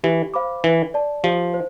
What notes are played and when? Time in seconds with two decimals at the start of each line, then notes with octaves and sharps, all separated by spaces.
0.04 E3 G4
0.34 C5 F5 B5 D6
0.64 E3 B4
0.94 D5 A5
1.23 F3 G4
1.54 C5